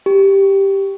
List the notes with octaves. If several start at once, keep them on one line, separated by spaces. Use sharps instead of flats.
G4